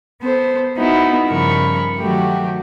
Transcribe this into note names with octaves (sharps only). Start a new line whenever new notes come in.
B3 A4 C5
B3 D#4 E4 F#4
G2 C#3 F3 A#4 B5 C#6
D#3 F#3 A3 F#4 G4